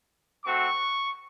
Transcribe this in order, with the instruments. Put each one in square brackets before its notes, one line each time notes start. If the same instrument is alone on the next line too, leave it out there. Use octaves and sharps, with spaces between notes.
[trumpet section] A3 C4 F#4 C#6